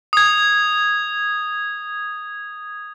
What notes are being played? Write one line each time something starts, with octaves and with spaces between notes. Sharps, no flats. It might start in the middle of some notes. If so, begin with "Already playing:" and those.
D#6 G#6